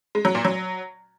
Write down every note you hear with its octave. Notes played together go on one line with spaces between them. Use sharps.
G#3
F#3
A#2
F#3